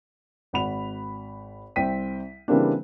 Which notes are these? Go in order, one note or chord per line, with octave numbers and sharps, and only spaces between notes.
G#1 F#5 B5 F7
C2 C4 G5 B6 D#7
C#3 E3 G3 A#3 C4 D4